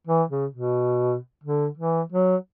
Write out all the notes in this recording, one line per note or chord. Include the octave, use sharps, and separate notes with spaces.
E3
C#3
B2
D3
E3
F#3